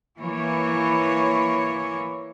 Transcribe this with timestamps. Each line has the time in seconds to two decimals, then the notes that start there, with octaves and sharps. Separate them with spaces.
0.18 E3 A#3 C#5